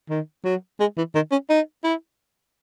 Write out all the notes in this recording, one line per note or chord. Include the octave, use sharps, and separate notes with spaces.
D#3
F#3
G#3
E3
D#3
C#4
D#4
E4